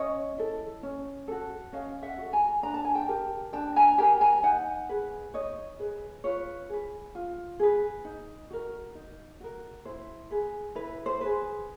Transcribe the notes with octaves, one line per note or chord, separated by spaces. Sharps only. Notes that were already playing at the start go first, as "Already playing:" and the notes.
Already playing: C#4 C#5 D#5
E4 A4
C#4
F#4 A4
C#4 D#5 F5
E5 F#5
F#4 A4
G#5 A#5
D4 A#5
A5
G#5
G5 A5
G4 A#4
D4 G5 A5
G#5 A#5
G4 A#4 G#5 A#5
G#5 A#5
D#4 F#5 G#5
G#4 B4
D#4 C#5 D#5
G#4 B4
F4 B4 C#5
G#4 B4
F4
G#4 B4
D#4
F#4 A#4
D#4
F#4 A#4
E4 C5
G#4 B4
E4 B4
C5
G#4 B4